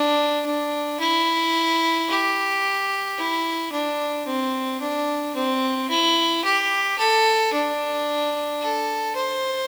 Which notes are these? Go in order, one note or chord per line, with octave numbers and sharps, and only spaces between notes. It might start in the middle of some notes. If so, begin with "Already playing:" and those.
Already playing: D4
D4
E4
G4
E4
D4
C4
D4
C4
E4
G4
A4
D4
A4
C5